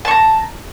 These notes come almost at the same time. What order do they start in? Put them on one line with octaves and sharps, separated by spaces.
A5 C#6 A#5